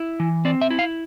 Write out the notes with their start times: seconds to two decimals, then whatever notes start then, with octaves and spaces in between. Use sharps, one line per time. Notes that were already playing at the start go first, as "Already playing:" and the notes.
Already playing: E4
0.20 E3
0.45 C4 D5
0.61 E5
0.70 E4
0.79 F5